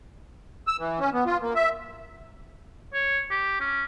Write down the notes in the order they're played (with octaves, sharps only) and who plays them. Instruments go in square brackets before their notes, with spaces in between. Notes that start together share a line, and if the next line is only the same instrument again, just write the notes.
[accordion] E6
E3
C#4
B3
F4
A#3
E5
[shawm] C#5
G4
C#4